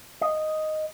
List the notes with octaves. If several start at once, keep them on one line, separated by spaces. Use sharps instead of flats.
D#5